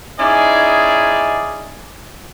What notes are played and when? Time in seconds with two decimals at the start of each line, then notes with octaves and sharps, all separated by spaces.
0.19 C#4 D#4 E4 G#4 D5